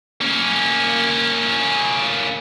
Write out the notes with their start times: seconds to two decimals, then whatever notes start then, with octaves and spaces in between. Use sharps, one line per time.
0.21 A#3 C#4